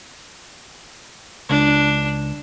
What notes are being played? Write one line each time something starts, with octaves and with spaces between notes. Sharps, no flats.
C#2 D4